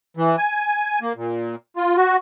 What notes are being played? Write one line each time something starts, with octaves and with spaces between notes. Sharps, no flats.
E3
G#5
A#3
A#2
F4
F#4